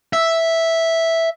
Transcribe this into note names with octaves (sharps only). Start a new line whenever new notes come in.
E5